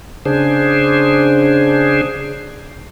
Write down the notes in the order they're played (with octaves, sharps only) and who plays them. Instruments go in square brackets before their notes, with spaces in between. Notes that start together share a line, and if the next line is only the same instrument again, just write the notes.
[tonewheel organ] C#3 D4 G#4 C5